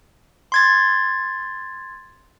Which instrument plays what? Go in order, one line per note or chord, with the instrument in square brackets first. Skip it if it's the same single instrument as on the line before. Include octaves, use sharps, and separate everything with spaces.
[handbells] C6 G#6 A6